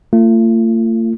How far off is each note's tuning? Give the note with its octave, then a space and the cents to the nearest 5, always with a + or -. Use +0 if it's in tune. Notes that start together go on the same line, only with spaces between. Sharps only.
A3 +45 F4 -25